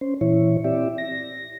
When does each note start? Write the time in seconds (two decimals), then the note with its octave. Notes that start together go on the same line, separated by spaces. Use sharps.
0.01 C#4 C5
0.21 A#2 E3 E4 C#5
0.64 C4 E4 G4 D5 E5
0.98 A#6